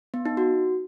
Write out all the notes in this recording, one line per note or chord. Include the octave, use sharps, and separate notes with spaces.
B3
D#4
F#4